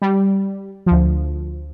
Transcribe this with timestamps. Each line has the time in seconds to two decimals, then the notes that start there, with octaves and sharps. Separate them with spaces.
0.02 G3
0.86 D2 F3